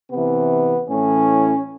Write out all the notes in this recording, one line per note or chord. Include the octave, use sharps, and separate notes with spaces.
C3 E3 B3
A2 E3 C#4